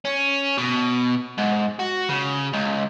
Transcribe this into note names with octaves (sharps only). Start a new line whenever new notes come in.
C#4
B2
G#2
F#4
C#3
C#2